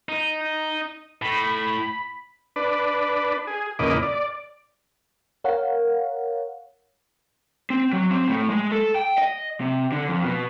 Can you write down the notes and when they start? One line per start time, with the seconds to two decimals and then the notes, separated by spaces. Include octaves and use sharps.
0.09 D#4
1.22 A2 B5
2.56 D4 B4
3.47 G#4
3.79 E2 A#2 C#3 D#5 B5 D6
4.02 D5
5.44 A#4 C#5 F5 F#5
7.70 C4
7.93 F#3
8.11 C4
8.28 A2
8.50 G#3
8.72 A4
8.96 G5
9.18 D#5
9.61 C3
9.92 D3
10.08 F2
10.24 B2